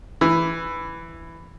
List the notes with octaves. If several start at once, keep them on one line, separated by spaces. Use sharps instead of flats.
E3